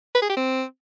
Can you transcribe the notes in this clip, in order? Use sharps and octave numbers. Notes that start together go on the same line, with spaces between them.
B4
G#4
G4
C4